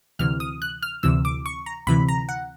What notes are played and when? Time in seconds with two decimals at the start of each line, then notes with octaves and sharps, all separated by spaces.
0.19 D2 C3 E3 F6
0.40 D#6
0.62 F#6
0.82 F6
1.03 D2 C3 E3 E6
1.25 D6
1.46 C#6
1.66 A#5
1.87 D2 C3 E3 B5
2.08 A#5
2.29 F#5